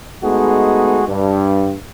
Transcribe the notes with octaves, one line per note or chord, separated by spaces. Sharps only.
G#3 A3 B3 D#4 F#4 G#4
G2